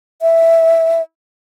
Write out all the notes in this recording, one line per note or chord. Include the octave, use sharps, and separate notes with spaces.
E5